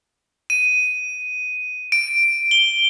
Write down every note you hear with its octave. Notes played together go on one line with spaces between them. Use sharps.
D#7
D7
G7